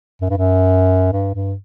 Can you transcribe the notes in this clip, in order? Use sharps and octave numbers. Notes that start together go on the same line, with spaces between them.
F#2
G2
F#2
G2
G2